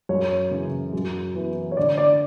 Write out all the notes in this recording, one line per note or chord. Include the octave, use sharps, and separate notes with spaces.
F#2 C#5
C#3 E3
F#2
E3 B3 E4
C#5
D3 D5
D5